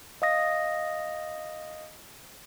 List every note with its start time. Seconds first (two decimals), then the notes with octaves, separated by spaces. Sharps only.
0.22 D#5 F5 D#6 A#6